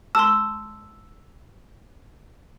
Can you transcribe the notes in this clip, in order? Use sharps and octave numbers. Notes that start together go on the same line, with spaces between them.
A5 C6 E6